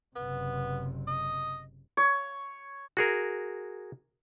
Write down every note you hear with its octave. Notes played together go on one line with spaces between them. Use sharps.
F#1 C3 B3
D#5
C#5
F#4 G#4 A#4